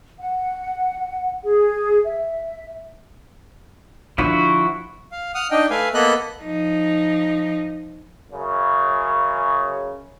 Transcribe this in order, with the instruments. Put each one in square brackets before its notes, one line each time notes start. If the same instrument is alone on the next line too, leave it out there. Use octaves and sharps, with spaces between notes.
[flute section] F#5
G#4
E5
[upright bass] D3 [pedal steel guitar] F3 E4 F#4
[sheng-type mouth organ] F5
F#5 D#6 F6
D4 D#4 D#5 G5
A3 B4 F5 G#5
A#3 B3 A4 D#5 B5 F#6
[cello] F3 D#4
[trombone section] F#2 C#3